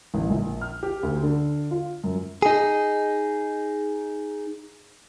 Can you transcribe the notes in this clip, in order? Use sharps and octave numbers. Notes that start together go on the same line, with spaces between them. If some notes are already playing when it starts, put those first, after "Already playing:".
A1
A#1
F6
G4
D2
D3
F4
F#2
D#4 G#4